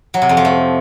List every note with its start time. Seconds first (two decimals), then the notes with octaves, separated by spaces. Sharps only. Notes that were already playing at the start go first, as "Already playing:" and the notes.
0.14 F#3
0.22 C3
0.29 F2
0.37 F3
0.45 A3